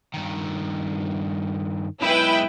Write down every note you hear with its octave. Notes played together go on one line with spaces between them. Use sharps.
G2 D#3
B1 G#3 E4 B4 G5